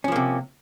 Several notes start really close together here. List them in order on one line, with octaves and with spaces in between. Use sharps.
C#4 F3 A#3 C3